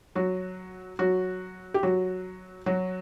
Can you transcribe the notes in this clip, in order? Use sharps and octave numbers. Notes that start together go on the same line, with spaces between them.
F#3 F#4
F#3 F#4
G4
F#3 F#4
F#3 F#4